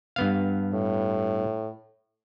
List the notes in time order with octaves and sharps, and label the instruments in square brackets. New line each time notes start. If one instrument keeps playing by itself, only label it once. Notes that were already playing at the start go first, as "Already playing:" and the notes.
[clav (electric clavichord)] G2 B3 F5
[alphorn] A2